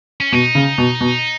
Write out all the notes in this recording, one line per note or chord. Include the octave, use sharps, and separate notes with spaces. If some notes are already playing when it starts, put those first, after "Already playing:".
C#4
B2 D#4
C#3
B2
B2